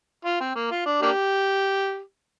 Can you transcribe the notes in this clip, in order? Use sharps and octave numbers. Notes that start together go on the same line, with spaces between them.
F4
C4
A#3
F4
D4
A#3 D4 G4